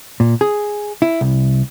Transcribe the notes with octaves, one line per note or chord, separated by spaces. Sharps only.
A#2
G#4
E4
C2